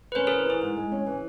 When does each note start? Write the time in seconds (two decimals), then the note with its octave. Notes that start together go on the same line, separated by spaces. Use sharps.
0.12 B4
0.15 C#4 A#4 C5
0.27 E3 G#4 A#4
0.46 E3 G#4
0.61 G#2
0.76 G#3
0.92 C#4
1.06 E3